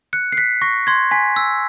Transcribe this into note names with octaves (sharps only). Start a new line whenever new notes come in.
F#6 C#7
C7
F#6 B6
C#6 A#6
C6 G#6
G#5 B6
E6